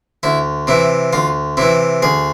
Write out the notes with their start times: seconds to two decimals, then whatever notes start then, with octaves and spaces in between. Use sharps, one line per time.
0.23 D2 E4
0.67 C3 E3 E4
1.13 D2 F4
1.57 C3 E3 E4
2.02 D2 G#4